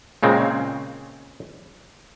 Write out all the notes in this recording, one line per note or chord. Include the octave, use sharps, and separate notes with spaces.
A#2 C#3 G#3 C4